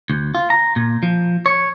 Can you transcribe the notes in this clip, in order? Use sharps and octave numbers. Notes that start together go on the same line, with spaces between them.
D2
F4
A#5
A#2
F3
C#5